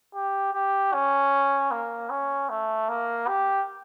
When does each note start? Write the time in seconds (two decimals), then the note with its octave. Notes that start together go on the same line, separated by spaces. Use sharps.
0.15 G4
0.53 G4
0.93 C#4
1.71 A#3
2.10 C#4
2.49 A3
2.89 A#3
3.27 G4